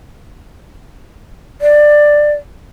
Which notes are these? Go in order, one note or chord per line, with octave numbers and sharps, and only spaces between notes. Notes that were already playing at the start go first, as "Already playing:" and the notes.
D5